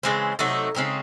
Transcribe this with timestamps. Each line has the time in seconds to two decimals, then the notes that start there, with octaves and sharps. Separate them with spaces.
0.03 C#3 E3 G#3 C4
0.39 C3 F#3 A3 D#4
0.75 C#3 G#3 C4 D#4